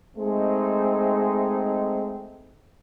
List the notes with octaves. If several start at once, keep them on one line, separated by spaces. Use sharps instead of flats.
G#3 A3 C4 D#4